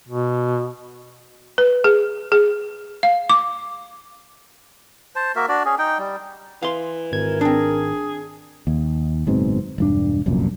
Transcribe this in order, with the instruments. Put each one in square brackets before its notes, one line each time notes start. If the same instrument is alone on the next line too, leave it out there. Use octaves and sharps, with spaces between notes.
[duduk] B2
[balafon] B4
G#4
G#4
F5
D6
[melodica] C5 A5
A#3 F#4 A#4 E5
D4 F#4 D5
C#4 G#4
D#4 G5
G3
[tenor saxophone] E3 [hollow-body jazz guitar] F5 C6
[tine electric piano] G#1 G#6 [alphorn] A#4
[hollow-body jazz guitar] C4 D4 [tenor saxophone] G#4
[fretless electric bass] D#2
F#1 G#2 B2 C4
E1 G2 D4
F1 C2 F#2 A#2